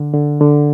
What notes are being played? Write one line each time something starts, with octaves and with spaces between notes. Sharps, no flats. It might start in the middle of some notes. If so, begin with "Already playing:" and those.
Already playing: D3
D3
D3